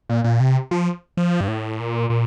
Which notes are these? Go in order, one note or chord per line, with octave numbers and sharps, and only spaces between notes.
A#2
A#2
C3
F3
F3
G2
A2
A#2
A#2